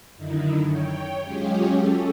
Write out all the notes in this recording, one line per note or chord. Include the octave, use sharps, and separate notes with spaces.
F#2 D3 D#3 D#4 E4
C#5 G5
F#3 G#3 C#4 F4 G4 G#4
C#4 A4